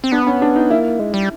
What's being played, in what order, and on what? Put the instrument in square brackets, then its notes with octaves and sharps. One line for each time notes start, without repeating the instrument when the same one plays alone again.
[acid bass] C4
[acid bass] B3 [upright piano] D4
[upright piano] C#4
D4
D#4
[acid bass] A#3 [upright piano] E4
[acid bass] G#3
G3